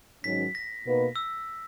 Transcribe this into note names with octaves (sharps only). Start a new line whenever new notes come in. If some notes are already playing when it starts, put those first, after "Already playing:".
G#2 D#3 F#3 C#4 B6
A#6
B2 A#3 D#4 F#4 B4
E6